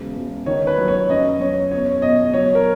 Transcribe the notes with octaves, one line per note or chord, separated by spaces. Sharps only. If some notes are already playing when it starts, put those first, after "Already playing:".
Already playing: E1 C#3
E1
D#3 C#5
B4
F#3
C#5
F#2 D#5
F#2 C#5
E2 C#5
B2 D#5
F#3 C#5
A#4